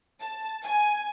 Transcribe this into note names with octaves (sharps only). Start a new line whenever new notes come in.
A5
G#5